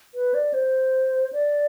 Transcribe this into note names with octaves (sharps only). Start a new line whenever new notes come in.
B4
D5
C5
D5